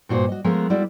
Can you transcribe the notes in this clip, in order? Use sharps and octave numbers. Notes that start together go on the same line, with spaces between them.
G2 A#2 F#4 B4 C5
F#4 D#5
F3 G#3 A3 B3 A#4
G3 G#3 E4 F#4 D5